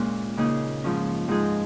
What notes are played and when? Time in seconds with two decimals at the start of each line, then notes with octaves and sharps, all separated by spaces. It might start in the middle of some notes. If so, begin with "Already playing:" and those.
Already playing: A#2 G#3 C#4
0.37 C#3 A#3 D#4 G#4
0.84 G#2 F3 C#4
1.28 G#2 F3 G#3 D#4 G#4